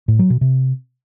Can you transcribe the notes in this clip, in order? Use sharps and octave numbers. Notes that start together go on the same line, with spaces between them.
A2
F#3
B2
C3